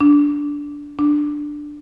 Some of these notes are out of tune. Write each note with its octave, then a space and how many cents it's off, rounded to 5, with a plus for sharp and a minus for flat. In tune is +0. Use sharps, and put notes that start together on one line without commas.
D4 -10
D4 +10